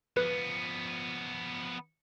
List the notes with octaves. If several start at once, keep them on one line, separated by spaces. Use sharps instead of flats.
F3 B3 B4